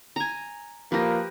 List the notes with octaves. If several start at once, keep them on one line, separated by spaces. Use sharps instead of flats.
G#5 A#5
F3 A#3 G4 B4 A#6